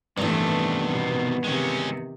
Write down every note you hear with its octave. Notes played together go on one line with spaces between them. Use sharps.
A1 G2 C3 D#3 A3 B3 D4
B2
C3 D#3 G#3 C#4